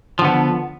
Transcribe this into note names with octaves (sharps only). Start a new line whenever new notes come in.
D3 F3 B3